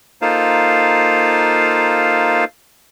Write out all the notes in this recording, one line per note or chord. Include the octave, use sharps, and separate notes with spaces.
A#3 D#4 F4 A4 C5 F5